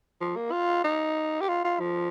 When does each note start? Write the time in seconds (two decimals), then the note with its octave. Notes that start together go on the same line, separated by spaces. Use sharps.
0.21 F3
0.36 A#3
0.52 F4
0.84 D#4
1.41 G4
1.49 F4
1.64 F4
1.80 F3